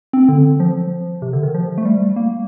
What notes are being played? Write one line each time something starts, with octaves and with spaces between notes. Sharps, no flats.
C4
D3
F3
C3
D3
D#3
F3
A3
G3
A#3